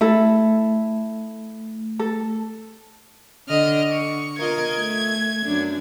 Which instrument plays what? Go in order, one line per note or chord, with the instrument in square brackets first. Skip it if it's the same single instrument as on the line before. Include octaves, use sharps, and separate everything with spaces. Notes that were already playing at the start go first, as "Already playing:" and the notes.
[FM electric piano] A3 [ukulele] E4 A4
[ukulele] A4
[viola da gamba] D3 [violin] D#5 F6
[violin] C#6
[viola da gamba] F4 A#4 D#5 [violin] G#6
[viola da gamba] A3
F#2 D4